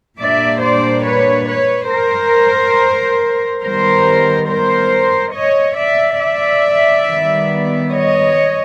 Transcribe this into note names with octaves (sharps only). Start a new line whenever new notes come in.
A#2 G3 A#3 D4 D5 E5
C5 D5
B4 C#5
B4 C#5
A#4 C5
D#3 G3 B3 A#4 C5
A#4 C5
C#5 D#5
D5 E5
D5 E5
D#3 G3 B3
C#5 D#5